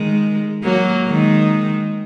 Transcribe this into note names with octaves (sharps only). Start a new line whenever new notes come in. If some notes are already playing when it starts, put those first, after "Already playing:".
Already playing: D#3 G#3
F#3 A#3
D#3 G#3